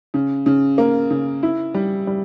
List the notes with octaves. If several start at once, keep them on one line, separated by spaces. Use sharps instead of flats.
C#3
C#3
A#3
C#3
E4
G3
G3